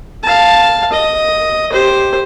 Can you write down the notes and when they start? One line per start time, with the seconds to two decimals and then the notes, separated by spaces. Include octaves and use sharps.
0.24 F5 A5
0.92 D#5
1.72 G4 C5